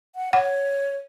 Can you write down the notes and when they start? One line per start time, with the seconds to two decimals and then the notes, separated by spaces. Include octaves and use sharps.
0.15 F#5
0.33 C#5 F#5